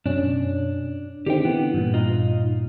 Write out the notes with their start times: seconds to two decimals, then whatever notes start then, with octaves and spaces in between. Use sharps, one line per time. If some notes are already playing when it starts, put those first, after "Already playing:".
0.06 F#2 B2 C#4 D4
1.26 D3 D#3 C4 G4 G5
1.45 E3 B3
1.74 G2 A#2
1.94 D#4 F4 D#5